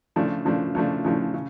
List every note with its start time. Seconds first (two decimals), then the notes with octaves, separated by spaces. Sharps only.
0.16 C#3 F3 A3 D4
0.45 C#3 F3 A3 D4
0.75 C#3 F3 A3 D4
1.05 C#3 F3 A3 D4
1.34 C#3